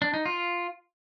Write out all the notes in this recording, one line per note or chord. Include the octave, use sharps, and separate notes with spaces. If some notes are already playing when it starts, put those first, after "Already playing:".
D4
D#4
F4